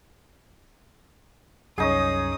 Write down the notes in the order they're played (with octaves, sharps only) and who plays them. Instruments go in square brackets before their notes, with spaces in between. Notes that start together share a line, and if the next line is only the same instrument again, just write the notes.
[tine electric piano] C2 F#2 [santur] C#4 D#4 G#4 [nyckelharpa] D#6